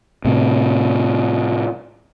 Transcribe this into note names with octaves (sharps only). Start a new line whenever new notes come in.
A2 C3